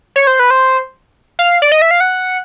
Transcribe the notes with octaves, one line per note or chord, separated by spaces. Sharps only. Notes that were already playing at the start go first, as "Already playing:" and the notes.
C#5
C5
B4
C5
F5
D5
D#5
E5
F5
F#5